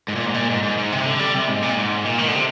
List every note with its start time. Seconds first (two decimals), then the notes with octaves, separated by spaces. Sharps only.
0.08 G#2
0.16 A#2
0.26 G#2
0.34 A#2
0.50 G#2
0.63 G#2
0.78 G#2
0.92 C3
1.05 D3
1.19 G3
1.34 C3
1.48 G#2
1.62 A#2
1.77 G#2
2.05 A#2
2.18 D#3
2.28 D3
2.35 C3